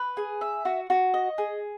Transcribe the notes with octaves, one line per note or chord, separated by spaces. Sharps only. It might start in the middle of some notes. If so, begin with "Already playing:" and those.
Already playing: B4
G#4
E5
F#4
F#4
D#5
G#4